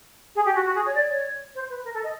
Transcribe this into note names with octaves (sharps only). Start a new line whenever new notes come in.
G#4
G4
F#4
F#4
G#4
C#5
D5
C#5
C5
B4
A#4
A4
D#5